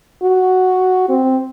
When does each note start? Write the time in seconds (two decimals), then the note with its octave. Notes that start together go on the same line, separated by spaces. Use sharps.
0.23 F#4
1.09 C4